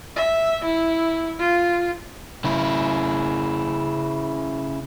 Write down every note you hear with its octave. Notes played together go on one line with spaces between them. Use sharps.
E5
E4
F4
C#3 E4